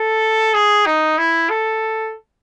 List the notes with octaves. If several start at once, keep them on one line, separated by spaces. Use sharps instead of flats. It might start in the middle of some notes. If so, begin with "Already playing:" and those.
Already playing: A4
G#4
D#4
E4
A4